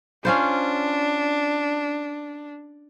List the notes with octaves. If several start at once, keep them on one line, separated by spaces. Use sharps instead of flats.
C#4 D4 F4 C5